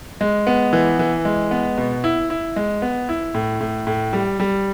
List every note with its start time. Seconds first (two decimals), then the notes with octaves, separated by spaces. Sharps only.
0.21 G#3
0.47 B3
0.73 E3
0.99 E3
1.25 G#3
1.51 B3
1.78 B2
2.04 E4
2.30 E4
2.56 G#3
2.82 B3
3.09 E4
3.34 A2
3.60 A2
3.87 A2
4.13 G3
4.40 G3